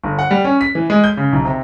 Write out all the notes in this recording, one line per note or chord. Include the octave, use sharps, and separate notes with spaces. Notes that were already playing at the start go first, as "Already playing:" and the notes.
G1
F#5
G3
C#4
B6
E3
G#3
G6
C#3
B1
C3